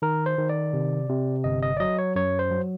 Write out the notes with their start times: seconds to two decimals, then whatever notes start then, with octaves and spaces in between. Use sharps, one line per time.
0.02 D#3 A#4
0.26 C5
0.38 D#3
0.49 D5
0.73 C3
1.10 C3
1.44 G1 D#5
1.62 D#5
1.77 D5
1.80 F#3 D#5
1.99 C#5
2.15 F#2 C#5
2.39 C5
2.51 F#3